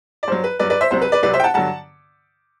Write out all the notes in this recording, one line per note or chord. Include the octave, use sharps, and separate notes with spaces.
D5
G2 F#3 C5
B4
G2 F#3 B4 D5
B4 D5
C5 E5
C2 C3 F#3 C5
B4
B4 D5
C2 C3 F#3 B4 D5
C5 E5
G5
F#5 A5
G2 D3 F#3 F#5 A5